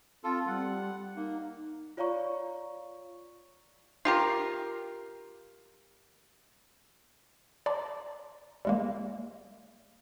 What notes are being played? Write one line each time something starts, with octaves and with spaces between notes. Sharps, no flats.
C4 F4 A4
G3 F#5
A#3 D#4
F4 C#5 D5 F5 A#5 C#6
F4 G4 A#4
D5 A5 A#5 C6 D6
G3 G#3 A#3